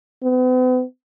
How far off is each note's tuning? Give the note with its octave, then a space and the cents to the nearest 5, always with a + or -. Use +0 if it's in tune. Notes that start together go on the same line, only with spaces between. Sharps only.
B3 +45